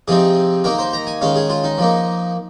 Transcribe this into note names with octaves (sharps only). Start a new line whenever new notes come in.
C3 F3 C4 D#4 G#4
D#3 A#3 D#4 A#4
C5
A#5
G#5
D#3 G#3 C#4 F5
G#4
F4
D#4
F3 A#3 D#4